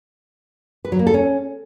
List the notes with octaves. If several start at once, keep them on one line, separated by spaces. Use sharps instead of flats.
B4
F#3
A#3
A4
C#4